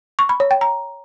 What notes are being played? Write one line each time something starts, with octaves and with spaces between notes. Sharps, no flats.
C#6
B5
C#5
G5
A#5